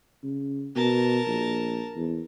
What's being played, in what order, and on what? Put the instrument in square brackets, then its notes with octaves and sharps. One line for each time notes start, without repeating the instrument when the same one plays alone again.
[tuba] C#3
[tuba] B2 [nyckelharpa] A#4 A5
[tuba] A#1
E2